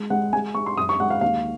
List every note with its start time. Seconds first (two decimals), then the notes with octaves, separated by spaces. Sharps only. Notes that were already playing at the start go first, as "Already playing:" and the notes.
Already playing: G#3
0.10 G#3 F#5
0.33 G#3 G#5
0.55 G#3 C#6
0.66 C6
0.77 F#2 D#6
0.89 C#6
1.00 G#3 F#5
1.10 F5
1.21 D#2 F5